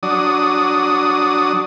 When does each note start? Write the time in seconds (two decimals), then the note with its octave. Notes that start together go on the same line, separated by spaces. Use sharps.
0.03 F#3 D4 D#6